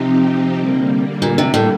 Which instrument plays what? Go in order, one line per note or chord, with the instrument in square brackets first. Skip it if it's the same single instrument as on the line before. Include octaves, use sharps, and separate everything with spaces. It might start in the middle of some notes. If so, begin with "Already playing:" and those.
Already playing: [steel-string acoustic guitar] C3 [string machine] F3 C4 D#4 G4
[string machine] D3 G3 A#3
[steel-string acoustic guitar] A#2
C3
A2